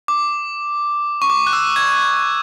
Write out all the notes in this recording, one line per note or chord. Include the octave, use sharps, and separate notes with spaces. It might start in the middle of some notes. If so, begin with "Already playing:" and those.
D6
C#6
D6
F#6
E6
G#6